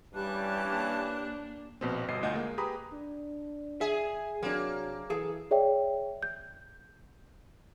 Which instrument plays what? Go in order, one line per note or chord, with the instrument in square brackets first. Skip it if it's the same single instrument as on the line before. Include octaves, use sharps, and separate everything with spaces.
[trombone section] G2 E3 C#4 [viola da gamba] G3 [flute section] G4 A5 F#6
[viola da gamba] A#3 D4
[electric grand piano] A#1 B2 C4
G1 B2 D#5 C7
D2 F4 D#5 F#5 G6
G#3 A#3
G4 G#4 B4 A#5 B5 D#6
[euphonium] D4
[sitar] G#4 [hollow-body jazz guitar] E5
[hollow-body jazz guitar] C3 D4 [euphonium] F#3 [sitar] A#3
[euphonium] E3 [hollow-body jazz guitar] G#4 A4 F5
[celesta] G#4 C#5 D5 E5 G5
G6